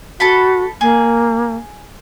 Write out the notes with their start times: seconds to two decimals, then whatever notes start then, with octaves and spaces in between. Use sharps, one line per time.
0.20 F#4 A4 A5 B5
0.81 A#3 G#4